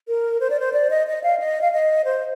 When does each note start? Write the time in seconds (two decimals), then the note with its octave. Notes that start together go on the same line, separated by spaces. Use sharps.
0.08 A#4
0.40 C5
0.50 D5
0.60 C5
0.73 D5
0.90 D#5
1.07 D#5
1.23 F5
1.39 D#5
1.61 F5
1.72 D#5
2.05 C5